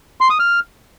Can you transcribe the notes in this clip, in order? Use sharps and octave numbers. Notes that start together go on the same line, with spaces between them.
C6
D#6
F6